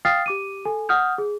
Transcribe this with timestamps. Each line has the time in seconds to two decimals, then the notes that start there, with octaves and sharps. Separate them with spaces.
0.05 F5 G5 D#6 F6 A6 C7
0.26 G4 D6 D#7
0.65 A4 G#5
0.89 F#5 D#6 F6 G6
1.18 G#4